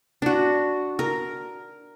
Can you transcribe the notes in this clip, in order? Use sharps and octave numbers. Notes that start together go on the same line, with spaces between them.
D4 F#4
A#4